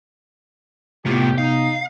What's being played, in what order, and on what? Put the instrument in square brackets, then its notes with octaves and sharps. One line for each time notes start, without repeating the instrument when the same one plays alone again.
[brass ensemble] C2 G4 [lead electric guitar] A2 F4 [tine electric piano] C3 B3
[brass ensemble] D#4 [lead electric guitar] F5